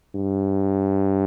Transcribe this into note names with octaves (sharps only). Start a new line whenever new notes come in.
G2